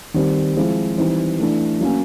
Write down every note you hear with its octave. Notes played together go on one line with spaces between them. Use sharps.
D#3 G3 C4
F3 G#3 C4 E4
E3 G3 C4 D#4
E3 A3 D4
F#3 A#3 C#4